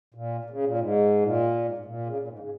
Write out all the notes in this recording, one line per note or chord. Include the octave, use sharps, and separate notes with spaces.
A#2
A#2
C#3
A#2
G#2
A#2
G#2
G#2
A#2
C#3
A#2
G#2
C#3